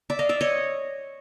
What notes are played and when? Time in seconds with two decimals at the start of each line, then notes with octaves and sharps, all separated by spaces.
0.10 D5 E5
0.19 D#5 F5
0.29 D5 E5
0.41 C#5 D#5